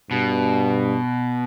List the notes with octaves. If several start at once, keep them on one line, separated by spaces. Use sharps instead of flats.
G2 B2